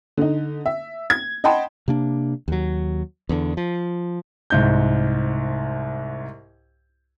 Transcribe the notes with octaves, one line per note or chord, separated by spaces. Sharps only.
D3 D#4
E5
G#6
D#5 F#5 G5 A5 B5 C6
C3 A#3 D4
D#2 F#3
E2 D3
F3
C2 G#2 G6